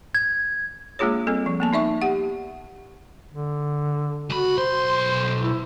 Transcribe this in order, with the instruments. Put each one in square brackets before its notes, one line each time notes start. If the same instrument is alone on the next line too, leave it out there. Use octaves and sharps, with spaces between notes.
[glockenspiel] G#6
[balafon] G#3 A#3 D4 F4 G#4 C#5
G3 C4 A4
F3
A#3 B3 A5
D#4 D5 E5 C#6
G4 F#5
[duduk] D3
[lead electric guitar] C#2 B5 [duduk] F#4
[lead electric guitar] B1 C6 [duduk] C5
[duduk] E4